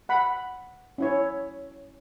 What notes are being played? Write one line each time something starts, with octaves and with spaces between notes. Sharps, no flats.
F#5 B5
C#4 E4 C#5